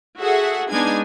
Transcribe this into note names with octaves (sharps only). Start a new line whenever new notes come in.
F#4 G#4 A4 E5 F#5
G#3 B3 D4 D#4 G#5 G#6